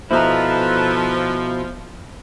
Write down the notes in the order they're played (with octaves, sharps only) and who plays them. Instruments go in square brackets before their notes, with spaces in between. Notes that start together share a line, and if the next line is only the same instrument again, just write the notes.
[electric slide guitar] B2 E4 [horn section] F3 [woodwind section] A4 B4 [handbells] C5 D#5 A#5